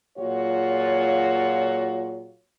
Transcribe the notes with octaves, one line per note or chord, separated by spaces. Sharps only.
A#2 F#3 F4 F#4 G#4 C#5